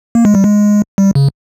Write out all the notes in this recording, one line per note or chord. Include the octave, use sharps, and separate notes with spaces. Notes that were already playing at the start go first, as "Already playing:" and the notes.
A#3
G#3
G3
G#3
G3
C#3